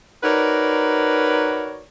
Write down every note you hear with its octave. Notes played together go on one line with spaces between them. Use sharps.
D#4 F#4 A#4 B4 C#5 D5